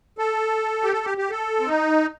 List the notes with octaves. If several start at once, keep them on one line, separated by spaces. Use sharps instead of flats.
A4
G4
A4
G4
G4
A4
C4
D#4